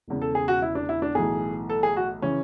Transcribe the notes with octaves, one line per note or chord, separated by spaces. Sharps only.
E1 E2 C#3
A4
G#4
F#4
E4
D4
E4
D4
B1 A2 E3 G#4
A4
G#4
F#4
C#3 E3 C#4